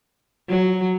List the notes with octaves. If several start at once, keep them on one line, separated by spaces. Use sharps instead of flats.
F#3